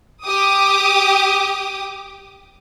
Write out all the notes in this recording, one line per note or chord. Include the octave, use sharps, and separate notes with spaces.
G4 D6 D#6